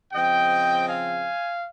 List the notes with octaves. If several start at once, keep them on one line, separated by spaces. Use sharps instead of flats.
C#3 F3 C4 D#5 G5
F5 G#5